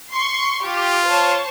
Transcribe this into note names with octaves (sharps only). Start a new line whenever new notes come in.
C6 C#6
F4 G4
C5 C#5 A5